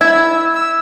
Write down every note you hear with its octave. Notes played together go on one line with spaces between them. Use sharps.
E4 E6 G#6
E6